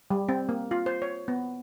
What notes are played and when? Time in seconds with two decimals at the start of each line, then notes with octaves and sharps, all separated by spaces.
0.10 G3
0.29 C4
0.49 A#3
0.71 F4
0.86 C5
1.02 C#5
1.28 B3